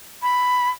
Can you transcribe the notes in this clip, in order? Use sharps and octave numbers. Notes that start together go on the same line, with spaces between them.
B5